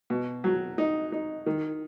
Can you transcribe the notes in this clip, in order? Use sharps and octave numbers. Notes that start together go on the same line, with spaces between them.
B2
F#3
D#4
D#4
D#3